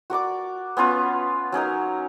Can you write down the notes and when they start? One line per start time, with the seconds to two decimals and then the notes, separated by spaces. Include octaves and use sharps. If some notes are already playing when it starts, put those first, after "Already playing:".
0.10 F#4 A#4 D5 D6
0.77 B3 C#4 F4 B4
1.52 F#3 C#4 D#4 A#4